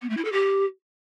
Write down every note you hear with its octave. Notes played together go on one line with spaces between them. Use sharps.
B3
A3
E4
A4
G4